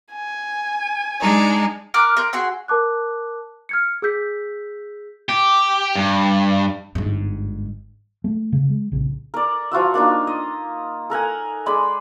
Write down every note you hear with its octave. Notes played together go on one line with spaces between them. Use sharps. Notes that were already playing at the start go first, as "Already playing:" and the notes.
G#5
G#3 D4 D#4
A#4 D6 F6 F#6
A#4 C6 G6
F#4 G#4 C6 E6
A#4 A5 D6 F#6
F6 G#6 C#7
G#4 E6 G6 B6
G4
G2
G1 G#2
A3
C#3
G#3
A#1 C#3
A#4 D5
F3 F4 F#4 E5
A#3 D4 D#4 F4
D#5
A4 A#4 F#5 G#5
G#3 G#4 D5 B5